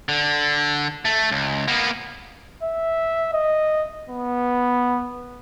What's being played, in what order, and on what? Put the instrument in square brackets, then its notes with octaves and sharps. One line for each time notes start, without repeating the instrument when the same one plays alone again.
[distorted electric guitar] D3
A3
C#2
A#3 B3
[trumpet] E5
D#5
B3